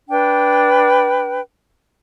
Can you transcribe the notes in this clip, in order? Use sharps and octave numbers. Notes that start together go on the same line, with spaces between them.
D4 B4 G5